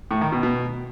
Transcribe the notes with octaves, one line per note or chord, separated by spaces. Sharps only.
A2
D#3
B2
B2